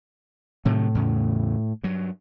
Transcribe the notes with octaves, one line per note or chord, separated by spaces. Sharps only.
A2 C3 D#3 F#3
E2 C#3
G2 F#3